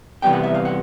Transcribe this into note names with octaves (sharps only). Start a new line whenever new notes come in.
C3 E3 G3 B3 G5
F#5
E5
F5
F#5